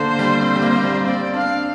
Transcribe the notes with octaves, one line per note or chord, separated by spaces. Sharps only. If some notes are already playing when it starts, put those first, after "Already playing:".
Already playing: D3 A#3 C5
G3
C4
G3
A#3
A#3
G3
C4 D5
D4 F5